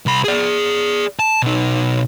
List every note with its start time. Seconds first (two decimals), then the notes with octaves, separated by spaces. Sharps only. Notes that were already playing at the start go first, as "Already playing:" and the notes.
0.06 C2 B5
0.24 G#4 D5
1.19 A5
1.42 B2 D#4